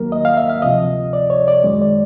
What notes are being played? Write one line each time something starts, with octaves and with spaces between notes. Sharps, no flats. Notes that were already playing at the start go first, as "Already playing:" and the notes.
Already playing: D#2 D#3 F#3 A#3 A#4
D#5
F5
E5
F5
D2 C3 F3 D#5
D5
C#5
D5
F#2 D#3 G#3
D5